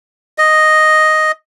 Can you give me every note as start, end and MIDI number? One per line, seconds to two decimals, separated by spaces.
0.38 1.32 75